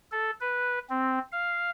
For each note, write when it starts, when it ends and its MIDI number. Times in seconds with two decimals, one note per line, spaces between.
0.11 0.31 69
0.41 0.79 71
0.90 1.19 60
1.32 1.71 77